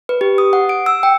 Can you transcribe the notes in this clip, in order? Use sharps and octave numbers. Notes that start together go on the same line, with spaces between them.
B4
G4
D#6
F#5
D7
E6
G5